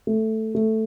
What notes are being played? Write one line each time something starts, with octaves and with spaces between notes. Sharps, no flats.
A3
A3